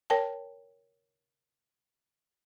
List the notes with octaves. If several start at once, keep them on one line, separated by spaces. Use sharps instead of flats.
A#4 C#5 G5 A5